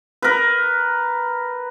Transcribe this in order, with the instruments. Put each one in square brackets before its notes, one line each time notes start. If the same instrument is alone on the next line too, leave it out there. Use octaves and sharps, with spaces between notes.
[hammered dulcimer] A#4 B4